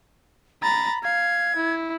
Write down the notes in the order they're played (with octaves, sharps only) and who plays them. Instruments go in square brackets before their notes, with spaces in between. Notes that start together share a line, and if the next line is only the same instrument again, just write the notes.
[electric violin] A#5 A6 [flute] B5
[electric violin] F5 [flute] G#6
[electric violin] E4